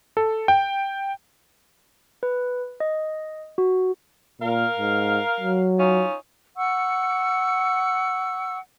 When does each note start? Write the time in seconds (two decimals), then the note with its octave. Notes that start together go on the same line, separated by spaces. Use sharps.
0.17 A4
0.48 G5
2.23 B4
2.80 D#5
3.58 F#4
4.41 A#2 A#4 F5
4.77 G#2
5.40 F#3
5.78 C#4 D#4 F4
6.57 F#5 C#6 E6